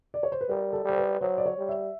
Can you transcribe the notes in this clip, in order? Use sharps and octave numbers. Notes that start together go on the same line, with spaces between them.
D5
C#5
C5
B4
G3 A#4
A4
G3 C5
B4
F#3 C5
D5
C#5
G3
E5